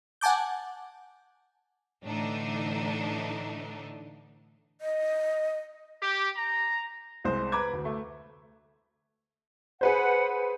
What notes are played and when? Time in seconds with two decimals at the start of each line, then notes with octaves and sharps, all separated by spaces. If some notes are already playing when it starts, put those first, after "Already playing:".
0.21 F#5 G#5 A5 D6 G6
2.04 A2 D3 E3 D4 D#4
4.81 D#5
6.01 G4
6.36 A#5
7.24 C2 G#3 C5
7.52 B4 A#5 B5 D6 G#6
7.73 D2
7.85 A3
9.81 G#4 B4 C5 F#5